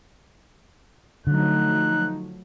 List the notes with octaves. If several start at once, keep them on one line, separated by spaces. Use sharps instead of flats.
D3 F3 F#3 A3 D#4 F#6